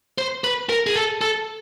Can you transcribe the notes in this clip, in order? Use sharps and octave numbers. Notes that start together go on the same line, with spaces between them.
C5
B4
A#4
G#4
A4
A4